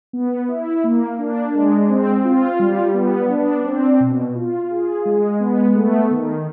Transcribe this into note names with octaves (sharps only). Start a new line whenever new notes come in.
B3
E4
A#3
D4
G#3
C4
F4
G3
B3
D4
C4
B2
F4
G#4
G#3
B3
A3
D#3